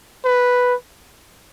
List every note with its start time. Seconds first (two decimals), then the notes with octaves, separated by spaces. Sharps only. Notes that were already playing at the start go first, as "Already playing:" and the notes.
0.25 B4